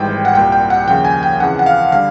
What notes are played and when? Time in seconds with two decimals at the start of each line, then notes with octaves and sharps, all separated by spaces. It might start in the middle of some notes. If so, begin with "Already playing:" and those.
Already playing: G#1 G#2 E3 G3 G5
0.25 F#5
0.35 C2 A#2 G3 G5
0.52 G5
0.70 F#5
0.87 D#2 C#3 F3 G5
1.05 G#5
1.23 G5
1.40 F2 C#3 E3 F#5
1.59 F#5
1.66 F5
1.92 D3 G3 F5